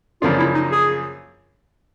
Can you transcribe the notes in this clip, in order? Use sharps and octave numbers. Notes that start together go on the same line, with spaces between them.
F#2 C#3 F3 A#3 D4 F4
E4
D#4
G#4